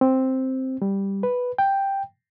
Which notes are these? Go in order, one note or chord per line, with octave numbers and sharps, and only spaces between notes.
C4
G3
B4
G5